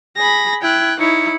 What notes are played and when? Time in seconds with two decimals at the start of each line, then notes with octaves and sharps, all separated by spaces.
0.17 G#4 B5 A#6
0.62 E4 G5 F#6 G#6
1.00 D#4 E4 C#5 C#7